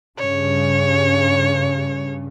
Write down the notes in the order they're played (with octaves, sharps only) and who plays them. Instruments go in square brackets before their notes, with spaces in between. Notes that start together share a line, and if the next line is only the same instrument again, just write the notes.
[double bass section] G2 C#3 [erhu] C#5